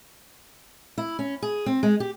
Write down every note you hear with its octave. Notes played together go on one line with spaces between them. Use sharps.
E4
C#4
G#4
C4
G#3
G4